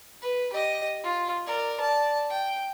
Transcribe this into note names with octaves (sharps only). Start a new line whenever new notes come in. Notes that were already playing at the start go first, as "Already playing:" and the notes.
B4
G4 D#5
F4
A#4 D5
D5 A5
G5